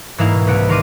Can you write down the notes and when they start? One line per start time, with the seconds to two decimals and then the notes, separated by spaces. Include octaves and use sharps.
0.18 G#2 E3 G#3 A#3 E4 F5
0.33 B2
0.47 C2 B4 F#5 D7
0.69 D#3 A#4 C6 D6 D#7